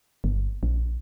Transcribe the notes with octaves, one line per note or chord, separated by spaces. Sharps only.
G1
A#1